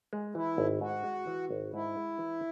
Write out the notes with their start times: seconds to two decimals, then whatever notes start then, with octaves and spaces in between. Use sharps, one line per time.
0.13 G#3
0.35 E3 E4
0.58 G#1
0.81 G#2 F#4
1.04 G#3
1.27 E3
1.50 G#1
1.74 G#2 E4
1.96 G#3
2.19 E3